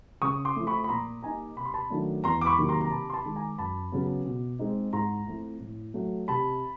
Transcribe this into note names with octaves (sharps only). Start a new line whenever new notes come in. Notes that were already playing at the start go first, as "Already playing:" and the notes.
C#3 C#6 D#6
C6 D6
F3 A3
B5 C#6
B5
A#2 A#5 C6
G3 A#3 D#4 G#5 A#5
C3 B5
C6
A5 B5
D#3 F#3 A3 D4
E2 A#5 C6
D6
B5 C#6
C3 D#3 F#3 A#3
A#5 C6
A#5
C3 A5 B5
C6
A5 B5
D#3 G#3
G#5 A#5
F#2 A5 B5
C#3 F#3 B3
B2
G#3 C4 D#4
G#2 A#5 C6
F3 A3 C4 E4
A2
F#3 A3
C3 A5 B5